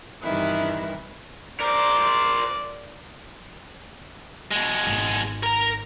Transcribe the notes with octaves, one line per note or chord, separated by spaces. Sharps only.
G2 C3 D#3 E3 E4
A#4 C5 D5
B2 G#3
G#1
A#4 A#5